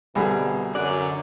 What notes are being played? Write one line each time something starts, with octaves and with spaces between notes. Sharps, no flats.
C2 B2 D3 G3 G#4 B5
F#2 D3 D5 F#6